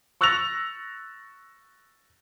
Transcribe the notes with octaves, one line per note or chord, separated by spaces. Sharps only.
C#6 E6 F#6 A6 A#6 F7